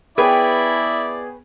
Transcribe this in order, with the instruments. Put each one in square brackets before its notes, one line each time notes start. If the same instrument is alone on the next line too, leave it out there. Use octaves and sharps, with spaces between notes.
[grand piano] B3 G#4 [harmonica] E4 D5 [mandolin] B4 C#5 G5